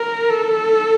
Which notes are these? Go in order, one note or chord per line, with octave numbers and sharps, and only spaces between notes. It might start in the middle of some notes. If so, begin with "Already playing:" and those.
Already playing: A#4
A4